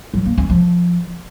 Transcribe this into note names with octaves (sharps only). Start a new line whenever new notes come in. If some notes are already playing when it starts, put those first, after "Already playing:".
F#3
A#3
C#4
F3